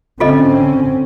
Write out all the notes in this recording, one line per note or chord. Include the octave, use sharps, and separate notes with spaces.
D3 C4 C#4 F4 A4 D#5